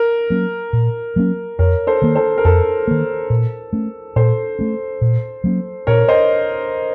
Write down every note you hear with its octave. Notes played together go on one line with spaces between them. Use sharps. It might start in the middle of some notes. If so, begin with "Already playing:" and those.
Already playing: A#4
F#3 A#3 C#4
A#2
F#3 A#3 C#4
F2 A#4 C#5
A4 C5
D#3 A#3
A4 C5
A#4
F2 A4
D#3 A#3
A#2
A3 C#4
A#2 A4 C5
A3 C#4
A#2
F#3 A#3 C#4
A#2 A#4 C#5
C5 D#5